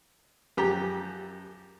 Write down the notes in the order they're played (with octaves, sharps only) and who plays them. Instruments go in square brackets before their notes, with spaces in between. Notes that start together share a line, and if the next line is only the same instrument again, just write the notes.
[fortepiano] F#2 F3 G4 G#4 A#5